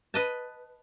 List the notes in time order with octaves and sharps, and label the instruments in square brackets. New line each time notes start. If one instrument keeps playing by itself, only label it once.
[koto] B4 D#5 A5